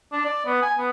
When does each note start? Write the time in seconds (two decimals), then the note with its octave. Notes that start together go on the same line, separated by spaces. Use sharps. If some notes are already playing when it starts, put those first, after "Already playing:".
0.12 D4
0.25 D5
0.46 B3
0.62 G#5
0.78 B3